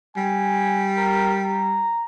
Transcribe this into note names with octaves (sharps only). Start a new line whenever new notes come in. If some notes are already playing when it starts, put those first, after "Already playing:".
G3 G#5
A#4
A#5